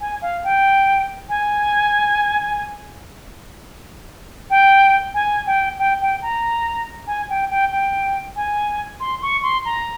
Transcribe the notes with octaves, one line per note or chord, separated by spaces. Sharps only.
G#5
F5
G5
G#5
G5
G#5
G5
G5
G5
A#5
G#5
G5
G5
G5
G#5
C6
C#6
C6
A#5